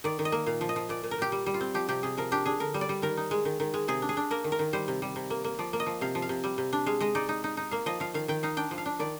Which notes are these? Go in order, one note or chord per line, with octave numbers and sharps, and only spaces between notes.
D#3 D5
D#3
D#5
A#3
A#2 F5
F3
D#5
F3
A#2 D5
A#2
A#4
A#2 G4
G3
G3
F4
C4
F3 G4
C3 G4
C3 G#4
F3 A#4
D4 G4
D4 G#4
D3 A#4
G3
D5
G3
D#3 A#4
D#4
G#3
D#3
D#3
G#3
C3 G#4
D4
G#4
D4
A#3 A#4
D#3
A#4
D#3
G3 C5
C3
G3
C3
A#3
A#3
F3 D5
A#3
D#5
F3
C3 F5
F3
F5
C3
G3
C3
D4
G#3 F5
G#3 D#5
D#4 D5
D#4
D#4
D#4
A#3 F5
F3 D#5
F3 F5
D#3 F5
D#3 G5
D#4 F5
D4 G5
F3
F5
D4
D#3 D5